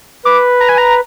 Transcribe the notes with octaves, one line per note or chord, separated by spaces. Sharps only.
B4 D6
A#5
G#5
A#5